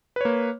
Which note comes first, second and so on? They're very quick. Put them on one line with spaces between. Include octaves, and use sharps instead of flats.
B4 C#5 A#3